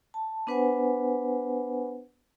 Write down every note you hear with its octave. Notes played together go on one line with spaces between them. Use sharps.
A5
B3 D4 B4 C5 F#5 G#5